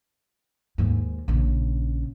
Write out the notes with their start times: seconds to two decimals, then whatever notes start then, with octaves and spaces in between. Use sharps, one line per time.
0.78 D#2 G#2
1.28 A#1 C#3